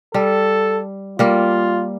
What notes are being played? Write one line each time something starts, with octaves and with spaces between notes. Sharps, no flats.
G3 A4
G3 A#3 F4